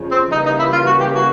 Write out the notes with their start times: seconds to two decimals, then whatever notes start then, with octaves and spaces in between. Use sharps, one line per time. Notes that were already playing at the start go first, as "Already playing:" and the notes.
Already playing: F2 C#3 F3
0.11 C4
0.32 C#3 E3 G3 A#3 D#4
0.46 D#4
0.59 E4
0.73 F4
0.87 F#4
1.00 G4
1.14 F#4